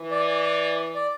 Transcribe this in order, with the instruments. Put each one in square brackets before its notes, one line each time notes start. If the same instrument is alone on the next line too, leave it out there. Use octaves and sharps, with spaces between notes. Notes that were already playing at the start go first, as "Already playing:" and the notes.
Already playing: [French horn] E3
[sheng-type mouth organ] D5
D5
D5